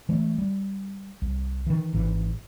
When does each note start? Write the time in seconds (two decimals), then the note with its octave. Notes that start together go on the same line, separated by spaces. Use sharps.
0.09 E3 G#3 A3
0.38 G3
1.22 C2
1.67 D#3 E3
1.93 G#1 G#2 E3